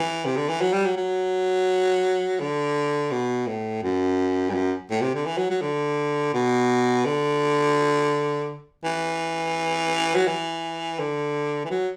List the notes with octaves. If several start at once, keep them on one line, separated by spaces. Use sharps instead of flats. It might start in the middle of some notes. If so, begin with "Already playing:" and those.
Already playing: E3
C3
D3
E3
F#3
G3
F#3
F#3
D3
B2
A2
F#2
G2
F#2
A2
C3
D3
E3
F#3
F#3
D3
B2
D3
E3
F#3
E3
D3
E3
F#3